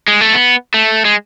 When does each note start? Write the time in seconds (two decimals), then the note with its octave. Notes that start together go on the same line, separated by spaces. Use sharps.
0.08 G#3
0.21 A3
0.34 B3
0.74 A3
1.05 G#3